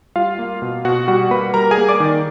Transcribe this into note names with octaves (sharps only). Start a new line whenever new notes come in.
G3 F4 F5
A#3
B2
B2 F#4 F#5
G3 F#4 F#5
A#3 B4 B5
G3 A#4 A#5
G#4 G#5
A#3
D5 D6
D#3